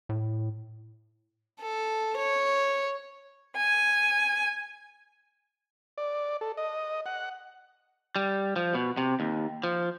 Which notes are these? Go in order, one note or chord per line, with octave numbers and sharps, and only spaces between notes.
A2
A4
C#5
G#5
D5
A4
D#5
F#5
G3
F3
B2
C3
D#2
F3